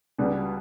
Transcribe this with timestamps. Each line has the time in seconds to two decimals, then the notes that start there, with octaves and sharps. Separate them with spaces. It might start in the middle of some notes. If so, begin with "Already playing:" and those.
0.18 C#2 B2 G3 B3